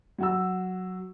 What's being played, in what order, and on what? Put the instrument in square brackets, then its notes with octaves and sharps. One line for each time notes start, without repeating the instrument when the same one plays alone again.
[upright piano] F#3 F#4 E6